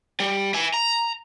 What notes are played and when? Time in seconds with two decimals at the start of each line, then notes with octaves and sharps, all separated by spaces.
0.20 G3
0.54 E5 G#5
0.74 A#5